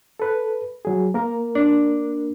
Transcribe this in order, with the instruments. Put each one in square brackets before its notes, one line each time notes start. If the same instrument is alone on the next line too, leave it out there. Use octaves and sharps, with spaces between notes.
[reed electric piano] A4 B4
F#3 G#4
A#3 A#4
[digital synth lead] D4